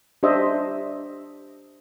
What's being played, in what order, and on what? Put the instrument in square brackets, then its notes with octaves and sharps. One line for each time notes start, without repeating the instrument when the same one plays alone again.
[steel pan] D4 G4 C5 D#5 E5